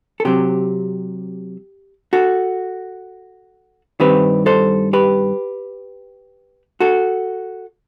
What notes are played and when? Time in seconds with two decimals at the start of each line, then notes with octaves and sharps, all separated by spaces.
0.20 A4
0.25 C3 F#3 C4 G4
2.13 F#4 A4
4.00 G2 D#3 G3 C4 G4 B4
4.46 A4 C5
4.93 G4 B4
6.80 F#4 A4